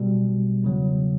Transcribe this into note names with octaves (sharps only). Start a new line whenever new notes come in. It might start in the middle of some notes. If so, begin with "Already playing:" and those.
Already playing: B1 B2 G3
E2 C#3 F#3